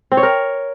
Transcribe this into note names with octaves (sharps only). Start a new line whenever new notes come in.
C4
C#5
A#4